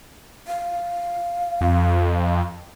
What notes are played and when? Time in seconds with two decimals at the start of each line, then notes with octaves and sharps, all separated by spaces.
0.47 F5
1.61 F2